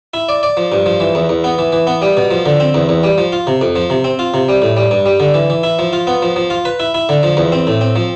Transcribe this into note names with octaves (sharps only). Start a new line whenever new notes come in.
E4
D5
D5
F3
G2
F3
E3
E2
E2
B3
E3
E3
B3
G3
B2
F3
D3
C4
E2
E2
G3
F3
F4
C3
F2
F3
C3
C4
F4
C3
G3
A2
G3
G2
G3
D3
E3
E3
E4
F3
F4
B3
F3
F3
F4
B4
E4
E4
D3
F3
E2
C4
A2
C4
F3